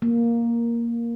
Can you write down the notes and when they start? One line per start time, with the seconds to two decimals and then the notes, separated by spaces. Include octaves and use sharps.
0.02 A#3